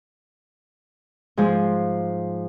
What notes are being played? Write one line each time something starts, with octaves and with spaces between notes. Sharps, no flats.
G#2 F3 G#3